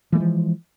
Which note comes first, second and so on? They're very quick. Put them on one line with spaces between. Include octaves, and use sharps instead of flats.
E3 A3 G#3 F3